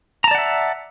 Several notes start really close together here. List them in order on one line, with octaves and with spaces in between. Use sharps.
A#5 A5 D5 F#5 E5